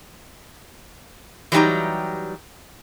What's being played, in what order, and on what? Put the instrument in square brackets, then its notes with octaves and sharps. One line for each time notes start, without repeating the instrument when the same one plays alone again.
[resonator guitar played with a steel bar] E3 F#3 G3 D#4 G4 A#5